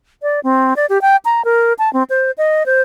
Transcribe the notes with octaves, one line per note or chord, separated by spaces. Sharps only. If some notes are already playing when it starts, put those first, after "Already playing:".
D5
C4
D5
G4
G5
A#5
A#4
A5
C4
C5
D#5
C5